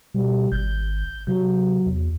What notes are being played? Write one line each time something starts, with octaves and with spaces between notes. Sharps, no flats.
B2 G3
G#1 G6
C3 F#3
E2